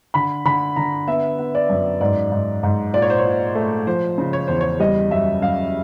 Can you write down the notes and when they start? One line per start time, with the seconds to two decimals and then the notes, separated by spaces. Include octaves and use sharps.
0.14 D3 B5
0.45 D3 B5
0.76 D3 A#5
1.08 B3 E5
1.39 B3
1.55 D5
1.70 F#2
2.01 G#2 D5
2.32 G#2
2.63 G#2
2.94 A#2 D5
3.02 C#5
3.10 C5
3.18 C#5
3.25 A#2
3.55 A3
3.87 F3 C5
4.18 C#3
4.33 C#5
4.48 E2 C5
4.61 C#5
4.80 G3 D#5
5.11 F#2 E5
5.41 F#2 F5